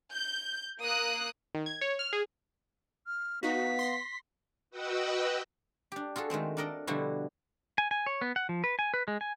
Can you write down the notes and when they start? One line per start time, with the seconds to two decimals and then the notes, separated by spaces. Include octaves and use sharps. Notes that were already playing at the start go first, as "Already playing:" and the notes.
0.15 G6
0.80 A#3 D#6 F#6
1.55 D#3
1.66 G#6
1.81 C#5
1.99 F6
2.13 G#4
3.07 F6
3.43 B3 D#4 F#4 F5 B6
3.79 C6 A#6 C7
4.71 F#4 B4 D#5 F#5 G5 E6
5.92 D4 G4
6.16 F4 F#4 G#4 A4
6.30 D#3 G#3 A3 C4
6.57 D4 A4 A#4 D5 D#5
6.87 B2 D3 F3 G3 E4 F#4
7.78 G#5
7.91 G#5
8.06 C#5
8.22 B3
8.36 F#5
8.49 F3
8.64 B4
8.79 G#5
8.94 B4
9.08 G#3
9.21 G#5